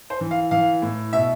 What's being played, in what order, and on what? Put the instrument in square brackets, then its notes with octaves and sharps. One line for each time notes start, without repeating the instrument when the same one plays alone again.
[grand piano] C5
E3
F5
E3 F5
A2
B2 E5